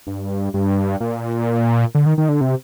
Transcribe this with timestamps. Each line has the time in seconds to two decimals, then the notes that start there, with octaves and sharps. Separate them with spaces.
0.07 G2
0.54 G2
1.00 A#2
1.95 D3
2.06 D#3
2.18 D#3
2.29 D3
2.41 C3